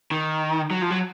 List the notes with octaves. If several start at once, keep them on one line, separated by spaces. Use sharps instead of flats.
D#3
F#3
F3
F#3